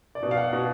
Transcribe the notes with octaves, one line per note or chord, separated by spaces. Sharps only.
D5
B2
F5
F#5
B2